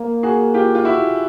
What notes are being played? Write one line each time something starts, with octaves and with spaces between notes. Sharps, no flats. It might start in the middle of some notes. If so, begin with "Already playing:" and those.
Already playing: A#3
F#4 G#4
F4 G4
F4
E4 F#4